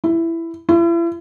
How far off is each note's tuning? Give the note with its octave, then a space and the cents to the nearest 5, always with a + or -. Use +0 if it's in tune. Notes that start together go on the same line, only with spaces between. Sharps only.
E4 +10
E4 +40